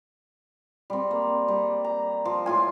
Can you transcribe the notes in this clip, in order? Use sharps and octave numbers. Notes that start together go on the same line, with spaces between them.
G3 C4
A#3
G3
A#5
F3
A2 F4 G#5